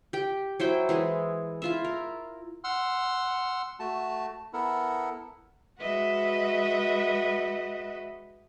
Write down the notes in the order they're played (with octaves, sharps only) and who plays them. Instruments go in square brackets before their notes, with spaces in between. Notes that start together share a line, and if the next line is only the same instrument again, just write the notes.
[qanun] G4 G5
F#3 E4 C5 G5
E3 G#3 G#4
E4 F4 E5
A#4
[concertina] F#5 C6 E6 F6
A3 F#4 A5
B3 E4 A4 A#4
[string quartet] G#3 F#4 B4 D#5 E5 F#5